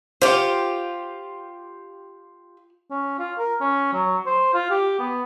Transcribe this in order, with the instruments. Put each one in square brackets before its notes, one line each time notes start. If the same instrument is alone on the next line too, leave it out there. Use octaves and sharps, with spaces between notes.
[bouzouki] F4 G4 [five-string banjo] C5 F#5
[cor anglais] C#4
F4
A#4
C#4
F#3
C5
F4
G4
B3